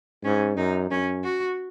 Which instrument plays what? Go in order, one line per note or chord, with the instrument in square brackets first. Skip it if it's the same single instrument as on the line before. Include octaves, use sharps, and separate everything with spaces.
[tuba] G#2 [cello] C#4
[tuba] F#2 [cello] D#4
[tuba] F#2 [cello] C#4
[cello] F#4